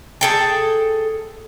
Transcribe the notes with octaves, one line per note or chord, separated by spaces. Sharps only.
G#4 A4 G5